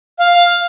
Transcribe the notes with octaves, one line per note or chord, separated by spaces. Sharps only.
F5